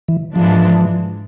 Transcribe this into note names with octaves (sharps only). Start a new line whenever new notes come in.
E3
G#2 E3 F3 G#3 D4